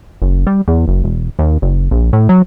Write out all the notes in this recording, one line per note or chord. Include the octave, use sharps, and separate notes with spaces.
F#1
G3
E2
F#1
E1
D#2
F#1
A#1
A2
F#3